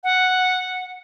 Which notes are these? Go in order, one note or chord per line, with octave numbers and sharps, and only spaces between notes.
F#5